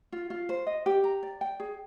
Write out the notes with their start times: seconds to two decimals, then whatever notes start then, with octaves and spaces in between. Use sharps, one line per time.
0.12 F4
0.30 F4
0.49 C5
0.67 D#5
0.86 G4
1.04 A#5
1.23 D5
1.41 G5
1.60 G#4